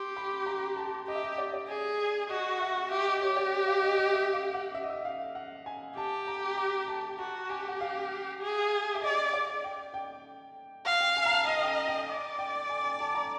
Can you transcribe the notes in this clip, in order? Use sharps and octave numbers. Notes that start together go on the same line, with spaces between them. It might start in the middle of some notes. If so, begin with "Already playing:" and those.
Already playing: G4 C6
B5
A#5
A5
G4 D#5
E5
D#5
D5
D5
G#4
F#4 D#5
E5
G4 E5
D#5
G4 C#5
D5
F5
D#5
D#5
E5
F5
F#5
E5
D#5
E5
F5
F#5
G#5
G4 A5
A#5
A#5
A5
F#4 A5
G4 G#5
F#5
F5
G#4
E5
D5 D#5
D5
G5
G5
F5 F#5
G5
G#5
A#5
A5
D#5 A#5
G5
G#5
G5
D5
G5
G#5
G#5
A5
A#5